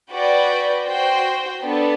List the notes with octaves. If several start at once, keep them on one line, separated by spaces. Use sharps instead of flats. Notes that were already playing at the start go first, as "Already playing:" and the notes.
F#4 B4 D5 G5
F#4 C5 G5
B3 D4 A4 D5